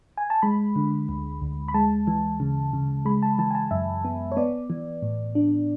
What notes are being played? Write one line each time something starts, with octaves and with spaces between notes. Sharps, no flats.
G#5
A5
G#3 B5
D3
D2
D2
B5
G#3 A5
E3
C#3
C#3
G#3 B5
A5
E3 A5
G#5
A5
F#2 E5
B3
C#5
B3 D5
E3
A2
D4